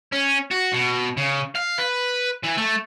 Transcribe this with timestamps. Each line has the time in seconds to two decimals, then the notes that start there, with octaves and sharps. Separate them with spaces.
0.12 C#4
0.51 F#4
0.73 B2
1.17 C#3
1.56 F5
1.79 B4
2.43 E3
2.57 A3